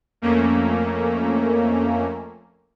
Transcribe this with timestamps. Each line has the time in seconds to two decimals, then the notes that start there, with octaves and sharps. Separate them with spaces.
0.22 F2 A3 A#3 C#4